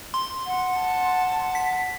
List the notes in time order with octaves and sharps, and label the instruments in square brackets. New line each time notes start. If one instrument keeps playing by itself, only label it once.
[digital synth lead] C6
[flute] F#5
[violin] A5
[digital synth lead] B6